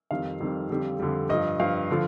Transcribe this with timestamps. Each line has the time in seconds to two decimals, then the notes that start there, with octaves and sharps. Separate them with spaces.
0.11 F2 D#3 G3 F5
0.40 F2 D#3 G3
0.70 F2 D3 G3
1.00 F2 D3 G3
1.29 G2 F3 D#5
1.60 G2 F3 F5
1.91 D3 F3